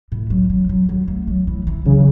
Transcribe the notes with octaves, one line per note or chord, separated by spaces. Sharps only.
A2
F#3
F#3
F#3
F#3
A3
F#3
E3
E3
C#3 F#3